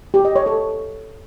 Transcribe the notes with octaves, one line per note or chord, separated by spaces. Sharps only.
G4
D#5
C#5
A4